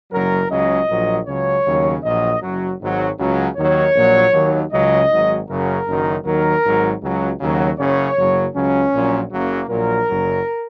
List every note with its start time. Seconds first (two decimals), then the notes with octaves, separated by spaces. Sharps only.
0.11 F#1 F#2 F#3 A#4
0.50 C#2 C#3 F#3 D#5
0.88 A#1 A#2 F#3
1.26 C#2 C#3 F#3 C#5
1.65 D#2 C#3 F#3
2.03 A#1 A#2 F#3 D#5
2.42 F#1 F#2 F#3
2.80 G#1 G#2 F#3
3.18 C#2 C#3 F#3
3.56 D#2 D#3 F#3 C#5
3.95 A#1 A#2 F#3
4.33 D#2 D#3 F#3
4.71 C#2 C#3 F#3 D#5
5.10 G#1 G#2 F#3
5.47 F#1 F#2 C#3 F#3 A#4
5.86 F#1 F#2 D#3 F#3
6.24 D#2 D#3 F#3 A#4
6.62 G#1 G#2 F#3
7.01 C#2 C#3 F#3
7.40 D#2 C#3 F#3
7.77 F#1 F#2 C#3 C#5
8.16 F#1 F#2 C#3 F#3
8.54 C#2 C#3 F#3 C#4
8.93 A#1 A#2 F#3
9.30 F#1 F#2 C#3 F#3 A#3
9.69 A#1 A#2 F#3 A#4
10.08 F#1 F#2 F#3